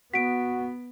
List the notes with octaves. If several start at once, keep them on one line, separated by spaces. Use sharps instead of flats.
B3 F#4 B6 D7